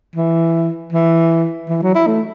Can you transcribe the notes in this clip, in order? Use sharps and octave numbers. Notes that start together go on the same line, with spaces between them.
E3
E3
E3
F#3
E4
A3